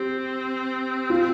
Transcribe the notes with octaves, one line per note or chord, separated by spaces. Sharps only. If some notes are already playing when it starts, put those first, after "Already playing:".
Already playing: C4 G4
F4